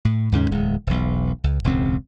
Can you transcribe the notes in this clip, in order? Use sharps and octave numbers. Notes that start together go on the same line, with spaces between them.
A2
D#2 G#2 C#3 C#4
D1 E2 G#3
E1 B1
C#2
E1 C#2 G#2 C4